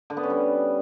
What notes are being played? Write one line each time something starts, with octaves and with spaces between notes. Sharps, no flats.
D3
B3
C#4
G3